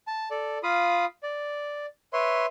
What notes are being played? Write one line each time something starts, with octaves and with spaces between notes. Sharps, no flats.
A5
A4 D5
F4 F5 B5 D#6
D5
B4 C#5 E5 C6